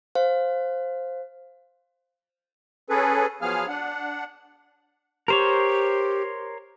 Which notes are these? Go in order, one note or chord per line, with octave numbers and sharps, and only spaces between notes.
C5 F5
C#4 G#4 A4 B4
F3 F#3 B3 G#4 F5 F6
D4 F#5
G4 A#4 C5 C#5